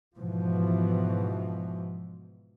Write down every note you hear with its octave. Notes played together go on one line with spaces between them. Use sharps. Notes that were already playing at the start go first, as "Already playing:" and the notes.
G#2 B2 E3 F3